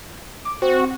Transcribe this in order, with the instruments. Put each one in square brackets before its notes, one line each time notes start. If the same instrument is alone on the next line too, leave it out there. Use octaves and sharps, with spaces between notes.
[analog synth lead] D6
[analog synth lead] C4 [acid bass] F#4